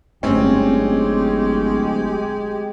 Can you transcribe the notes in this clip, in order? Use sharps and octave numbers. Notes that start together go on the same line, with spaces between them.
D1 G1 G#3 A3 C4 C#4 G4